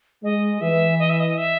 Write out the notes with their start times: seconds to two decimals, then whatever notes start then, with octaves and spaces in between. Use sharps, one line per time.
0.24 G#3 D#5
0.61 E3 E5
0.99 D#5
1.10 E5
1.20 D#5
1.37 E5